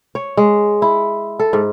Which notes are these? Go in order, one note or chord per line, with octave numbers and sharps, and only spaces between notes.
C#5
G#3
E4
A4
G#2